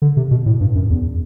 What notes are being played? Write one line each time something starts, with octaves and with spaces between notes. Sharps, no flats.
D3
C3
B2
A2
G2
F#2
E2